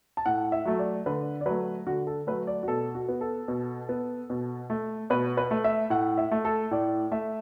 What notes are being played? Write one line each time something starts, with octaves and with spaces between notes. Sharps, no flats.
A5
A2 F#5
E5
F#3 A3
D5
D3 B4
D5
F#3 A3 B4
D3 F#4
A4
F#3 A3 B4
D5
F#4
B2 A4
F#4
B3
A4
B2
B3
B2
A3
B2 B4
B4
A3
E5
A2 F#5
E5
A3
A4
A2 D5
A3 E5